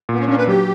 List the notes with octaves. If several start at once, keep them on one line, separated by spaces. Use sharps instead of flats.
A#2 B3
C#4
A#3 C#4 D4
B4
F#3 G4